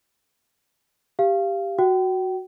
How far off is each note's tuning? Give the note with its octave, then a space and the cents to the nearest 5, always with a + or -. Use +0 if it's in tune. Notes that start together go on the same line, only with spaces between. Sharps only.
G4 +5 F5 -20
F#4 +0 G5 -35